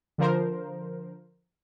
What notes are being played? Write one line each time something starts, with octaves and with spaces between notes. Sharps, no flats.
D3 F3 A#4 C5